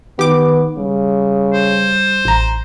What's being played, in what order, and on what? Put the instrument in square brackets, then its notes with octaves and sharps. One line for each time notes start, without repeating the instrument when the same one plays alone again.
[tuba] D#3 [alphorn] B3 [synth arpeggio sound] G4 D6
[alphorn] C#3 [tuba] G3
[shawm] C5
[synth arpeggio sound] A1 A#5